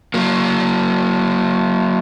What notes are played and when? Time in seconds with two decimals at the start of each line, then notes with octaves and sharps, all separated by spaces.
0.14 F#3 A#3